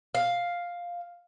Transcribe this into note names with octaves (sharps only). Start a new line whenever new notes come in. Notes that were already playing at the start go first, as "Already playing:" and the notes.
F5